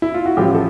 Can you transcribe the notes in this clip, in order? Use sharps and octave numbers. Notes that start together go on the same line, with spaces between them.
E4
F4
F#4
A1 A2 F3 F4 G4
A4